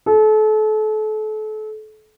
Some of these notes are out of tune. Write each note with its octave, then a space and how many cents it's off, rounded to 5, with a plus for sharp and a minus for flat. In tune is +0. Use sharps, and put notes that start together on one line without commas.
A4 -35